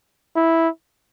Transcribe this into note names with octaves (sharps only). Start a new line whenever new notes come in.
E4